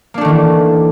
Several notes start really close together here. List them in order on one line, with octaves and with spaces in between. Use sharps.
A#3 D4 A3 D#3 E3